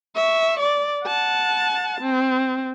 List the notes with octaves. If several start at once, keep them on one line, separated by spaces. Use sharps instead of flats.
E5 C#6
D5
F#5 A5
C4